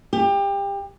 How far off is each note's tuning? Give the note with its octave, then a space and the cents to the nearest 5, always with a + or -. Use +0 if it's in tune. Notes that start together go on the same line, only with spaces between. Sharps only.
G4 +25